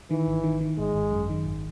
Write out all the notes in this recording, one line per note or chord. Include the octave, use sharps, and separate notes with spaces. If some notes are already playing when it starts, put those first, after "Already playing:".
D#3 E3
G#1
D#3
D#3
G#1 G#3
G#1
F#2
D#3
G#1